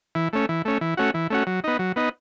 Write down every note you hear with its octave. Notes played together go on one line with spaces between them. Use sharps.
E3
A3 C#4
E3
A3 C#4
E3
A3 C#4 F#4
E3
A3 C#4 F#4
F#3
B3 D#4
F#3
B3 D#4